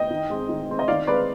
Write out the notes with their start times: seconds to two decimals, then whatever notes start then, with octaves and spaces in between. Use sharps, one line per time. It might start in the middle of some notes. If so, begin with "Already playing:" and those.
Already playing: D#5 G5
0.10 D#3
0.30 G#3 C4
0.49 D#3
0.69 G#3 C4
0.79 D#5
0.88 D#3 D5 F5
1.07 G#3 C4 B4 D5